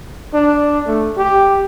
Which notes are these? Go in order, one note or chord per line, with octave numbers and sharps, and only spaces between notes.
D4
A3
G4